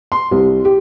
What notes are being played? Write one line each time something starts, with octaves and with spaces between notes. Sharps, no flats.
C6
C2
G4